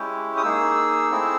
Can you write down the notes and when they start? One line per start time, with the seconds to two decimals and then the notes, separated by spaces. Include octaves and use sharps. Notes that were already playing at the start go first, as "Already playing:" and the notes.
Already playing: G#3 C#4 E4 G4
0.37 D#6
0.43 A#3 D#4 G#4 E6
1.11 A3 C4 E4 G#4